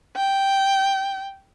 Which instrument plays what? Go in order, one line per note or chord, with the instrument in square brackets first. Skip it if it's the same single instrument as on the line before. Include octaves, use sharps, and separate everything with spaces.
[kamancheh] G5